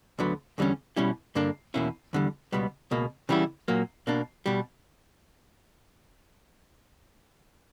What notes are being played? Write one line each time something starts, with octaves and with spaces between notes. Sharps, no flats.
D2 D3 F#3 B3
E2 D3 G3 C#4
B2 G3 C#4 E4
G2 D3 A#3 D4
E2 B2 A#3 C#4 E4
E2 D3 G3
C#2 B2 G3 B3
C#2 B2 A#3
C#3 E3 G3 B3 E4
A#2 F#3 A#3
B2 A#3 D4
B2 G3